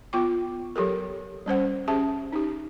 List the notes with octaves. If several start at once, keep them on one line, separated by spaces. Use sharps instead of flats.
B3 F4 G5 D6
F#3 G4 A4 A#4
G3 C#4 C5 F#5
C#4 G4 G#4 E5 A5
D#4 G4